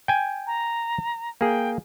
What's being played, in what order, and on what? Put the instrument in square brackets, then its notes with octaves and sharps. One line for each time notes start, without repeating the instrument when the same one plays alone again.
[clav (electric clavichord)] G5 G#5
[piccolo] A#5
[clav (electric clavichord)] A#3 G#4 [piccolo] G5